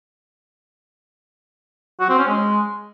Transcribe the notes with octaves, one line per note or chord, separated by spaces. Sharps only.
F#4
C4
C#4
G#3